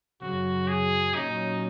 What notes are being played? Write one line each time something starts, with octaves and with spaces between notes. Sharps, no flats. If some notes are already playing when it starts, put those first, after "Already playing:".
F#2 C#3 F#3 F#4
G#4
A#2 F#3 C#4 D#4